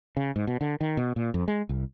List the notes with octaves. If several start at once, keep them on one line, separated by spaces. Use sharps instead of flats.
C#3
G#2
B2
D3
D#3
B2
A#2
F2
G#3
C2